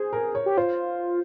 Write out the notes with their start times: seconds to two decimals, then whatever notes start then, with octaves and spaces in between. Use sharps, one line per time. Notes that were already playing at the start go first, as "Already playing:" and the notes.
Already playing: G#4 C5
0.13 A#4
0.35 C#5
0.46 G4
0.57 F4 C5